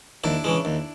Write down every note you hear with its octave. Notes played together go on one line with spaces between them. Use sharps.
D#2 D4 E4
C#3 E3 G#3
D#2